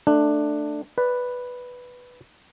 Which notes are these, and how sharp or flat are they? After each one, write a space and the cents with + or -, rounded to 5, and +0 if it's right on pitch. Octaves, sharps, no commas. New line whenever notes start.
A3 +10 D4 +15
B4 +0 D5 +0